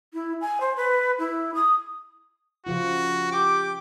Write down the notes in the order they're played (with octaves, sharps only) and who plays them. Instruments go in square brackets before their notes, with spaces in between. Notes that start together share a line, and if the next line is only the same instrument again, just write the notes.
[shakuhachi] E4
G#5
C5
B4
E4
D#6
[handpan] C#3 F3 F4 [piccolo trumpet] F#4
[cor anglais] G4 [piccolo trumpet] D6